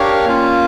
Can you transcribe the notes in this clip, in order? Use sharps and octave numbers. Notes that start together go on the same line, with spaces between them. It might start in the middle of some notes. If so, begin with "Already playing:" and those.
Already playing: D4 G4 A#4 C#5 F5
A#3 C#4 F4